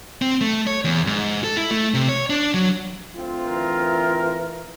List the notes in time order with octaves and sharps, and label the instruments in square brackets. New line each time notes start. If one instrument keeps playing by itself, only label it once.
[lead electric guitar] C4
A3
C#5
E2
G#2
A4
E4
A3
C3
C#5
D4
F#3
[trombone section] D2 C4 F4
[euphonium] E3 [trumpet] A#4